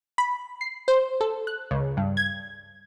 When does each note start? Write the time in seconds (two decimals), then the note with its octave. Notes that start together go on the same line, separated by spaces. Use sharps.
0.18 B5
0.61 C7
0.88 C5
1.21 A4
1.47 F#6
1.71 C#2
1.97 G2
2.17 G#6